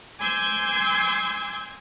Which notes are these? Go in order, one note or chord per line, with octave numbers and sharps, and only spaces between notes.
G#5 C6 D6 E6 G6 G#6